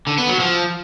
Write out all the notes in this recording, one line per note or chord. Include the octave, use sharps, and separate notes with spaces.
D3
B3
F#3
F3